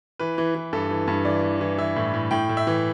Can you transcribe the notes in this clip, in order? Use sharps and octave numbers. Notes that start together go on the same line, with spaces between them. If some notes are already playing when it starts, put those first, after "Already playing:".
E3 B4
E3
E3
G2 A4
E3
G2
E3 D5
E3
E3
E3 E5
A2
A2
A2 G5
A2
E5
E3